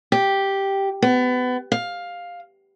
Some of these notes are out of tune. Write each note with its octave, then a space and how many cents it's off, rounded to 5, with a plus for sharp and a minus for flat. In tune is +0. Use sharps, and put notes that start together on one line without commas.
G4 +0
B3 +25
F5 +10